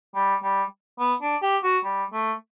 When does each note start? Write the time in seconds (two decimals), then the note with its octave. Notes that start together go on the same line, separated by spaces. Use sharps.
0.15 G3
0.43 G3
0.99 B3
1.21 D4
1.42 G4
1.63 F#4
1.84 G3
2.13 A3